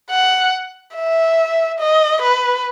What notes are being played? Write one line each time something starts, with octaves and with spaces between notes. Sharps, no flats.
F#5
E5
D#5
B4